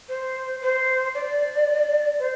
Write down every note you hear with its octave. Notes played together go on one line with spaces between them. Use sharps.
C5
C5
D5
C5